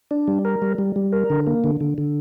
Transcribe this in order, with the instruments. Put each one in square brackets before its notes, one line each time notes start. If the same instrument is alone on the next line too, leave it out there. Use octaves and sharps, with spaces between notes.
[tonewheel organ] D4
G3
A#4
G3
G3
G3
A#4
D3
A#3
D3
D3
D3